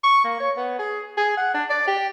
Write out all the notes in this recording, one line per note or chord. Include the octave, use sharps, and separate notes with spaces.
C#6
A#3
C#5
B3
G#4
G#4
F#5
D4
D5
G4